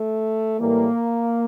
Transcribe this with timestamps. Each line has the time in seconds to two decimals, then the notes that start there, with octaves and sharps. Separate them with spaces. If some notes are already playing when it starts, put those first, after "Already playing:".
Already playing: A3
0.59 A2 E3 G3 A#3